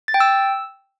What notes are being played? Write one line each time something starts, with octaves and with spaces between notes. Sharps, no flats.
A6
G5
E6